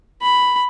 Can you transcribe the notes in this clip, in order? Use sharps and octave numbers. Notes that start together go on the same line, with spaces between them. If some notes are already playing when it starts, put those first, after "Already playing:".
B5